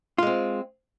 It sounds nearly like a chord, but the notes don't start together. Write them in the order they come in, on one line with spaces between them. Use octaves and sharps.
F4 G#3 C4